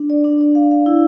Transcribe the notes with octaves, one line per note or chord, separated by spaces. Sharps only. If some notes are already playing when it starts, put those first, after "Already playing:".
Already playing: D4
D5
D4
D5
F5
F5
E4